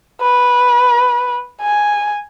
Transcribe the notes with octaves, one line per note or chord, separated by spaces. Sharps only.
B4
G#5